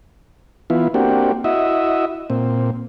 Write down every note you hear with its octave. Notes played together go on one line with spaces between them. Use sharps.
E3 B3 E4 F4
A#3 C4 D4 F#4 G4
E4 F#4 D#5 E5
A#2 C4